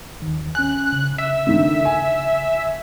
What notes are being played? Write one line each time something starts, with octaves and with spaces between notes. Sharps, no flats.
D#2 D#3
C#4 G#5 F#6
C#3
E5
D3 D#3
G#5